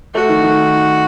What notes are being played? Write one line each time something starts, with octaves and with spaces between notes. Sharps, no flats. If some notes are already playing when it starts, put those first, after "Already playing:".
A3 F#4
D#3
D#3